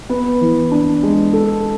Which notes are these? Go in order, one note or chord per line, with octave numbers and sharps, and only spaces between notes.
B3
E3
D4
G#3
A4